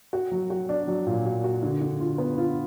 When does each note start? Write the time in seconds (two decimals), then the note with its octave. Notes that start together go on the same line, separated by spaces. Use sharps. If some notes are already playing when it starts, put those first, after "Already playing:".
0.13 F#4
0.31 F#3
0.50 F#4
0.69 D4
0.88 F#3
1.07 A#2
1.25 F#4
1.44 F#4
1.63 D3
1.81 D3
2.00 F4
2.18 B3
2.38 F4